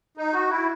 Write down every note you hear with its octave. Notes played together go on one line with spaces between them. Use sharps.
D#4
F#4
E4